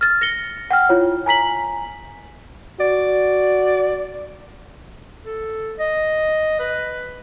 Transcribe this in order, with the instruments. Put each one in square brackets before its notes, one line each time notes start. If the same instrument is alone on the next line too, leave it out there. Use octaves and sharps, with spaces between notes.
[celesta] F6 A6
A#6 C#7 G7
F#5 G5 F6
E4 F4 C#5
G#5 A#5 B6 F#7
[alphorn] F#4 [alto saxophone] D5
[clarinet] A4
D#5
B4